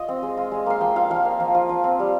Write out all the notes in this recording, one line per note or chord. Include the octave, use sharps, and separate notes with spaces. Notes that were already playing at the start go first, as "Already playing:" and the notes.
Already playing: F4 D#5
C4
G#3
F4
G#3
A#3 F5
F3 G5
F4 F5
F3 F5
A#3
F3
F4
F3
C4
G3